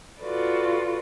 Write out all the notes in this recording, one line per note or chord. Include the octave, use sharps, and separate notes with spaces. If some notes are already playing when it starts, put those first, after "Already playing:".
F4 F#4 A4 B4 D5